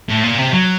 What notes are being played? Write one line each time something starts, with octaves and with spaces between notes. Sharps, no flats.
A2
A#2
C3
F#3